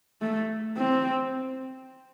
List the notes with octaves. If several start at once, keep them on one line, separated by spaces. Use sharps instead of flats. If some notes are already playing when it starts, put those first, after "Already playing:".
A3
C4